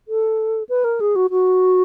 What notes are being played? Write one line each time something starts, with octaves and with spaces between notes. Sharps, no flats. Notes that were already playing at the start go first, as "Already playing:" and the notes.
A4
B4
A#4
G#4
F#4
F#4